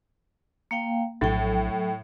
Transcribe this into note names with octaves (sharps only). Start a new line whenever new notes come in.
A#3 F5 G5
A#1 A2 F#3 G5